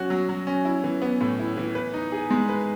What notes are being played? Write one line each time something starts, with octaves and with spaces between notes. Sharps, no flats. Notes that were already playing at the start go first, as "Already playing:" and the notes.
Already playing: F#3 C#4 F#4
F#3
F#3
C#4
E4
E3
B3
A2
E4
E3
B4
D#4
G#4
G#3
B4